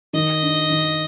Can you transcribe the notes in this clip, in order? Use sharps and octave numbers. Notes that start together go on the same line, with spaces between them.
D#3 D#5
D4
D#3